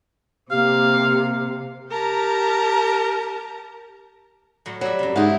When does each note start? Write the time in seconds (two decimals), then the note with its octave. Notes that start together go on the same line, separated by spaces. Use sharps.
0.51 C3 A#3 G4 F5
1.90 G4 A#4 A5 A#5
4.66 A2 F#3
4.81 F#3 G3 E5
4.99 F#2 C3
5.16 G#2 D3 C4 D#4 E4 F#5